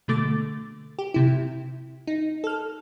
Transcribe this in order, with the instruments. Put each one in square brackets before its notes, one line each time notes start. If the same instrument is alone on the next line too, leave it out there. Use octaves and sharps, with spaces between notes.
[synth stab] B2 D3 A3 D6 A6
G4
C3 E4
D#4
A4 F6